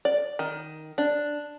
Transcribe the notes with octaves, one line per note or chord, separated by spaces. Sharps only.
D5
D#3
D4